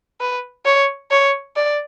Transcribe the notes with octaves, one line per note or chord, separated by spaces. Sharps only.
B4
C#5
C#5
D5